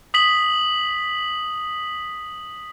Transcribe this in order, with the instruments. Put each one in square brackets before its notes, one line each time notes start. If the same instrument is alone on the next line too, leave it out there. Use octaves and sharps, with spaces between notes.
[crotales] D#6 B6 F#7